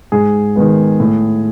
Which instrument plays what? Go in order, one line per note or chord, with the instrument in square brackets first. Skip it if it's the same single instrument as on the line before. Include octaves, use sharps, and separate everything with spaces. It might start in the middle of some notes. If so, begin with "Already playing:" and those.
[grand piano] G#2 G#4
D#3 G#3 B3
A2